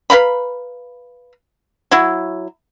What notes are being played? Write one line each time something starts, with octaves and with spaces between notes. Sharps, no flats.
B4 F5 A#5 B5
F#3 E4